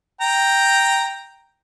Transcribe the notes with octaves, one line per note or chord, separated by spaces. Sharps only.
G5 A#5